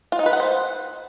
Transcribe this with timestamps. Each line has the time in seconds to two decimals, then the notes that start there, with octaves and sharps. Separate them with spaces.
0.12 F4
0.19 D#4
0.26 B4
0.33 F#5
0.40 C5